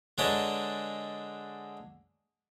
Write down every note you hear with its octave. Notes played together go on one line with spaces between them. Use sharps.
D3 G#3 D4 B4 C#5 A#5